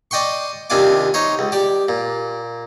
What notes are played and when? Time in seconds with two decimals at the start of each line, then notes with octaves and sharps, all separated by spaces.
0.11 D5 D#5 G5 C6 C#6
0.70 D#2 C3 D4 F4 G#5 D6
1.14 D#4 C5 C#5
1.39 C#2
1.52 G4 D5
1.89 A#2